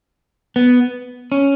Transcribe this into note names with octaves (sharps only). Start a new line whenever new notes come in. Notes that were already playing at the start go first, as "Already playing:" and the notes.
B3
C#4